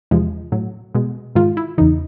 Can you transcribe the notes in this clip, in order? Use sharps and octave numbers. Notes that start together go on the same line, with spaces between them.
E2 C3 F3 G#3
A2 F#3
B2 G#3
G#2 D#3 G#3 F4
E4
E2 C#3 E3 D#4